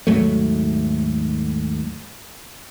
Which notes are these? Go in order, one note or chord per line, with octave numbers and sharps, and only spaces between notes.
D#2 G#2 F#3 A3